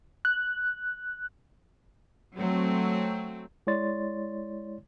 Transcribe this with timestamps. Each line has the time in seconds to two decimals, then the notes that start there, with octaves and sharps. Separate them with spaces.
0.25 F#6
2.35 F#3 A3 C4
3.67 G#3 E4 C#5 D5 C6 A6